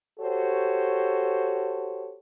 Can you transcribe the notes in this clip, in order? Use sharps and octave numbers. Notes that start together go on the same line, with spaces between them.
F#4 G4 A4 C5 C#5